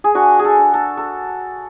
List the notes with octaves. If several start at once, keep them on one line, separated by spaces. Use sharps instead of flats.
G#4
D4 F#4
G#4
A4
D4
A4
A4